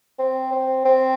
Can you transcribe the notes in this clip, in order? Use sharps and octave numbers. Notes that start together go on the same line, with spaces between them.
C4
C4
C4